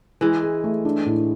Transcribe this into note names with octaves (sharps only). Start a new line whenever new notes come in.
E3 G#3 E4
G#4
A3
D4
A2